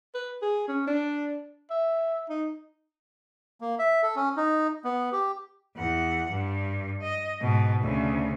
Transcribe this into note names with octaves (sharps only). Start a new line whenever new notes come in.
B4
G#4
C#4
D4
E5
D#4
A#3
E5
A4
C#4
D#4
B3
G4
E2 F#5
G2
D#5
G#2 B2
D2 C#3